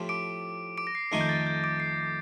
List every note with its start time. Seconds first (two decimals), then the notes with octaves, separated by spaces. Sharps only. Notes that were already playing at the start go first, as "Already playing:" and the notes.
Already playing: A2 F3 C4 G4
0.09 D6 D7
0.78 D6 D7
0.87 A#6
0.95 C7
1.11 F2 D#3 A3 D#4 C7
1.21 G6
1.29 A6
1.47 G6
1.64 D6 D7
1.80 C7